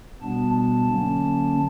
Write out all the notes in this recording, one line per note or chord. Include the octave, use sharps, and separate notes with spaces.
B2 G3 B3 D4 A5
A5
D3 F#3 A#3 C#4